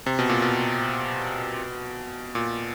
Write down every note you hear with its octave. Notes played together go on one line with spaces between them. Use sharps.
C3
B2
A#2
B2
A#2